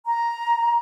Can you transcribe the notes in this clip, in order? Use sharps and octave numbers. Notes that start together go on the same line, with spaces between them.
A#5